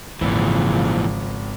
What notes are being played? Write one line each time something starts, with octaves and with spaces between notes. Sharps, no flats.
G#1 A#2 C#3 E3 F3